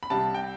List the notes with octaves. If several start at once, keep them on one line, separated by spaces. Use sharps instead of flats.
B5
C2 C3 G3 A5
G5